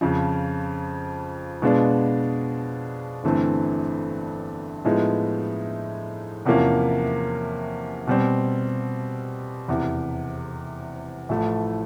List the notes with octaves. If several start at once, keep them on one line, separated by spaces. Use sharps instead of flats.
F2 C#3 F3
B2 G#3 B3 D4 F4
G1 G2 E3 A3 C4
A2 F3 G#3 B3 D#4
E2 C3 F3 A#3 C#4
B2 G3 C4
F1 E2 C3
A1 A2 F3 A3